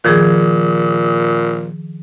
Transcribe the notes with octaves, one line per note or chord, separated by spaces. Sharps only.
A#2 D#3 F3 G#4